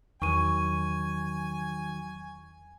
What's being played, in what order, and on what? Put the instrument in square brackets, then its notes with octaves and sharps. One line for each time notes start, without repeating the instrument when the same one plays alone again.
[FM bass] E2 [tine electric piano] D#3 F#3 [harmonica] G#5 [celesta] C#6 D#7